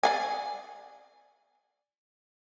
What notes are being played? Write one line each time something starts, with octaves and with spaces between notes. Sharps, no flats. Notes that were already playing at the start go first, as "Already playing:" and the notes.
D5 F5 G#5